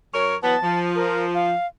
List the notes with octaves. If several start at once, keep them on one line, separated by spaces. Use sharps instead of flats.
F#2 A#4 C#5
E3 F#3 B3 A5
F3
A#4
F5